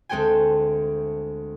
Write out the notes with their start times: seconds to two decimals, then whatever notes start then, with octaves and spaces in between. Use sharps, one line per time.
0.09 D2 G#3 C4 A4 G5 G#5